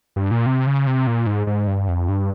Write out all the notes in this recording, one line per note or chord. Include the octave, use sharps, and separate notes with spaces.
G2
A#2
C3
C#3
C3
A#2
G#2
G#2
G2
F2
G2